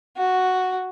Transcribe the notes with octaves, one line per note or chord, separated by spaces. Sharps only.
F#4